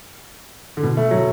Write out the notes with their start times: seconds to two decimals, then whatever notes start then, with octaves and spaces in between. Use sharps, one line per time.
0.77 D3
0.83 B2
0.97 A3
1.11 F#3